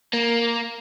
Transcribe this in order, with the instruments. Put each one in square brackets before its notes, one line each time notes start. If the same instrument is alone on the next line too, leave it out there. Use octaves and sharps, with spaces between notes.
[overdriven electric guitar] A#3